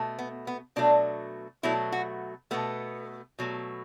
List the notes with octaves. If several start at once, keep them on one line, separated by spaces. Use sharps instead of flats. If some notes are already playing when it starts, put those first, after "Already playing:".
Already playing: B2 A3
B3
B3
B2 F#3 A3 D4
B2 F#3 A3 E4
F#4
B2 A3 B3
B2 F#3 A3